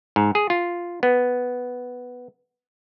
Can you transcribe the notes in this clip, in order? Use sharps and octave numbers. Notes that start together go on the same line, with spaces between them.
G#2
G#4
F4
B3